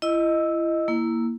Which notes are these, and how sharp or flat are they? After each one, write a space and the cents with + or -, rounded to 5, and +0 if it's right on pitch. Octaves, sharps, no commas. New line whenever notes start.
E4 +35 D#5 +0 E6 -10
A#3 +0 E4 +0